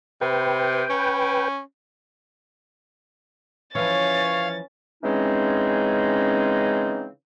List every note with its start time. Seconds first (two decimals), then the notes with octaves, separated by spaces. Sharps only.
0.21 C3 B4 G5
0.90 C#4
3.75 E3 F3 C#4 C#5 F5 A6
5.02 C#3 E3 G#3 C4 C#4 D#4